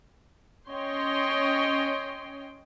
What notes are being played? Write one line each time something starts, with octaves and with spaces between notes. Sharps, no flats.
C#4 C#5 D#5 G5 C6